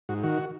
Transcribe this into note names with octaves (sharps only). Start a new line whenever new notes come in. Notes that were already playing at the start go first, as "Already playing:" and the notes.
G#2 F#4
D#3 F#4